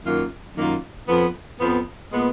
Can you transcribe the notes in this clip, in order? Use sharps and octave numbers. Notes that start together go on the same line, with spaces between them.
F#2 D#3 A#3 F4
F#2 D#3 A#3 F4
F2 F3 B3
F2 F3 B3
A#2 G#3 B3